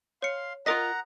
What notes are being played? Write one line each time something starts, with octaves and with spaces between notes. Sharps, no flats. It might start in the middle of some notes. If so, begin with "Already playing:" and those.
C#5 F5 C6 C#7
F4 A#4 D#5 F#5 A#5 D#6 A#6 B6